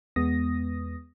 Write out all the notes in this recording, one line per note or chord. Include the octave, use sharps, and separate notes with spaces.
E2 G#3 B3 D#6 A#6